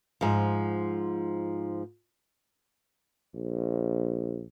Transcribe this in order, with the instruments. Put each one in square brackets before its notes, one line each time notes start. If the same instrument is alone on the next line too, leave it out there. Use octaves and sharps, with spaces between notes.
[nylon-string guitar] G#2 F3
[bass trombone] A#1